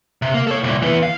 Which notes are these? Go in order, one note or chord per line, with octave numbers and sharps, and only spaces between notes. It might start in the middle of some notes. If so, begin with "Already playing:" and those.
C3
A#3
A4 C#5
C2 A#2
E3 B3
F5